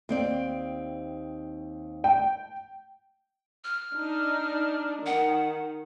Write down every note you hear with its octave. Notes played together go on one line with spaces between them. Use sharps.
D#2 C4 D5
G5
F6
D4 D#4
D#3 F#5